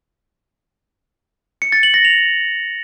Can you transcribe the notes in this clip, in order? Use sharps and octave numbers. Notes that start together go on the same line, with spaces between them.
C#7
A6
F#7
A#6
F7